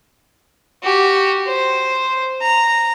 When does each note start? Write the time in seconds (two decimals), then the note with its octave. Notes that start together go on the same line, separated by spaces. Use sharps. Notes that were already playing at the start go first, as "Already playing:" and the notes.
0.83 F#4 G4
1.47 C5
2.42 A#5